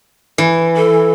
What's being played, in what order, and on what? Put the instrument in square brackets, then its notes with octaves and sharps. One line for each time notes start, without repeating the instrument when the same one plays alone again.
[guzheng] E3
[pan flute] A4